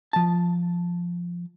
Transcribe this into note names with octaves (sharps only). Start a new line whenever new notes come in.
F3 A5